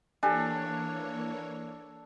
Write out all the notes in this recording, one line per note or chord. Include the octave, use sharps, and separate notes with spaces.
E3 A#3 D4 G4 A4 C#5 G#5